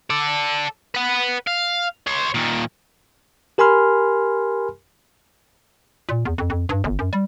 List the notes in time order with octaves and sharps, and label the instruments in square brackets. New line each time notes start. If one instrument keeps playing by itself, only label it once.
[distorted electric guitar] A4 D5
B4 F#5
F5
C#5 C6
A#2 D#3
[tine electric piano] G4 A#4 G#5 B5 C6 F6
[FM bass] A#2
E2
F2
F2
G2
G1
F#2
G3